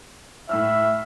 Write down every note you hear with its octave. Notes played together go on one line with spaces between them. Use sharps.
A2 E5 E6 F6